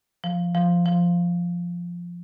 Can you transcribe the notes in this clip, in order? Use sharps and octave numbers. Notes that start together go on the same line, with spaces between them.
F3
F3
F3